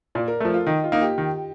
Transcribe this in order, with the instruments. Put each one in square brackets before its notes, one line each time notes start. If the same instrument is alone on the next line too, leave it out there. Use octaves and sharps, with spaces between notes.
[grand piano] A#2 [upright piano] D5
[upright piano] A#4
[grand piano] F3 A3 [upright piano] A4
[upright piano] F4
[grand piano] D#3 [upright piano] D#4
[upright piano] F4
[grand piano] A#3 D#4
[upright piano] G4
[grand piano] D#3